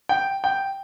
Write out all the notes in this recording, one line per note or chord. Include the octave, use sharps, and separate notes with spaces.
G5
G5